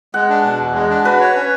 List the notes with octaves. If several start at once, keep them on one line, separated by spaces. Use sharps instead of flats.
G#3 F#5
D4
B2
E2
G#3
D4
F#4 B4
C#5
C#4